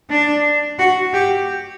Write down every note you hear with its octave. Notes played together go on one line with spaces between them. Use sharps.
D4
F#4
G4